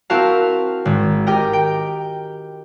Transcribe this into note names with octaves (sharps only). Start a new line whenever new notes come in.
C4 E4 F#4 A#4 F5 A5
G#1
G4 A#4 D#5 G5 A#5
G5